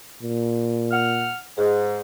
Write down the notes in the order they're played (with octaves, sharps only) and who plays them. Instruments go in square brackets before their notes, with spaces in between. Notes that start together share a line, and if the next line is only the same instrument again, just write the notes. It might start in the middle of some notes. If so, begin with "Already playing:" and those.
[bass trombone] A#2
[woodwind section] F#5 F6
[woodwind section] G#2 [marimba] G#4